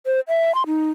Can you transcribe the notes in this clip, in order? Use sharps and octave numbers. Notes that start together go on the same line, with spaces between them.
C5
E5
C6
D#4